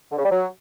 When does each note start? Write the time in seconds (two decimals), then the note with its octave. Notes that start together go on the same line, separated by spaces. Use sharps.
0.11 D3
0.18 C#3
0.24 G3
0.31 F#3